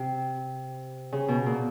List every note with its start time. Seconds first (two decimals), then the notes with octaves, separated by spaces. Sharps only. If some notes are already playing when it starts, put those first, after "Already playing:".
Already playing: C3
1.12 C#3
1.28 B2
1.46 A#2